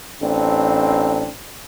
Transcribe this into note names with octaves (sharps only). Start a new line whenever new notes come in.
A1 C4 D4